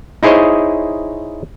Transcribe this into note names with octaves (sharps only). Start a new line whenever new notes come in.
D#4 E4 G#4 C5 C#5 D#5